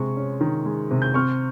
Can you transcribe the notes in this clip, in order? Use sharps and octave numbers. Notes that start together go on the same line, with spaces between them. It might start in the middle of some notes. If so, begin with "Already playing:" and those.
Already playing: C3 G#3 C#6
C#4
D#3
G#3
C3
G6
C4 C#6 F6